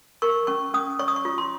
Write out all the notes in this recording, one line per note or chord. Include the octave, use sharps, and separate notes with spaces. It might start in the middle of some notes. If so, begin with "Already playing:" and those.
A#4 C#6
C#4 C#6
C#4 D#6
C#5 C#6
D#6
C#6
F4
C6